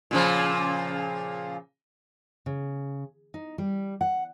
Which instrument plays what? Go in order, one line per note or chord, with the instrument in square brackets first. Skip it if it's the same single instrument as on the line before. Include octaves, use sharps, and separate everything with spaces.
[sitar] A#2 C#3 F3
[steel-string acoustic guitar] C#3
D#4
G3
F#5